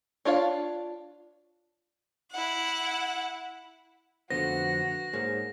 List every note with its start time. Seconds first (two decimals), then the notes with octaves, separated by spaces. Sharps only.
0.25 D4 F4 C#5 F5
2.31 E4 F#5
4.30 F2 D3 A3 B3 F#4 C5 A#6
5.13 G#2 A#3 G#4 C5 C#5